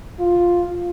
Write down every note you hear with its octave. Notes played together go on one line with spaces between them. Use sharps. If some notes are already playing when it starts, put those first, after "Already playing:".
F4